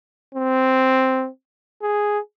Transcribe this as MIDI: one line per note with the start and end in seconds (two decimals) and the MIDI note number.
0.35 1.28 60
1.82 2.19 68